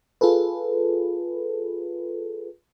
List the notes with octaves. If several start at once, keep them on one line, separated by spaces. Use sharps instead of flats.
F4 G#4 A4 B4